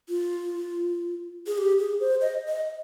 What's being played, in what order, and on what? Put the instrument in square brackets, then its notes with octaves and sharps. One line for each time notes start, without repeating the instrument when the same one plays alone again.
[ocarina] F4
G#4
G4
G#4
C5
D#5
D#5